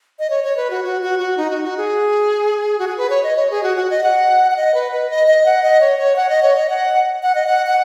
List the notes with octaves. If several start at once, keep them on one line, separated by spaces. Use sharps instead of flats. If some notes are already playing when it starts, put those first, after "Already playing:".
D#5
C#5
C#5
B4
F#4
F#4
F#4
F#4
D#4
F#4
F#4
G#4
F#4
G#4
B4
C#5
D#5
C#5
G#4
F#4
F#4
D#5
F#5
F#5
D#5
B4
B4
D#5
D#5
F#5
D#5
C#5
C#5
F#5
D#5
C#5
D#5
F#5
F#5
D#5
F#5
F#5